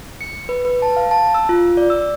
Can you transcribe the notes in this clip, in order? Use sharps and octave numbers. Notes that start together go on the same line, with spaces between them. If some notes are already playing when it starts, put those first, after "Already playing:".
C#7
B4
B4
A5
F5
A5
E6
F4
D5
E6